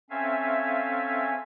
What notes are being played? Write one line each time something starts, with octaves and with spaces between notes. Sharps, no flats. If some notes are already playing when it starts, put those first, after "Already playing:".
C4 C#4 A4 E5 F5 G#5